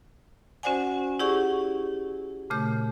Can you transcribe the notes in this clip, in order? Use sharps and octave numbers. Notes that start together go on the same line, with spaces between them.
C#4 F#4 C5 D5 F#5 G#5
E4 G4 G#4 D5 F#5 C#6
A#2 C#3 A3 G6